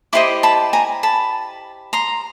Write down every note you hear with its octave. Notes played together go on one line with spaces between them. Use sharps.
E4 G4 C5 D#5 C6 D6
A5 B5
G#5 A#5
A5 B5
A#5 C6